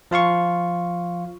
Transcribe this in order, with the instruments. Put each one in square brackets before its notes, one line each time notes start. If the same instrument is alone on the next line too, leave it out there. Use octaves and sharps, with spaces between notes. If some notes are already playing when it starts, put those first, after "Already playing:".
[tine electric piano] F3 F4 F5 C#6